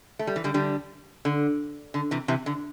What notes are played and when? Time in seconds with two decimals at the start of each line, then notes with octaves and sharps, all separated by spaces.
0.19 A3
0.27 G3
0.36 E3
0.44 D3 G3
0.54 D3 G3
1.25 D3
1.94 D3
2.11 C3 E3
2.28 C3 E3
2.46 D3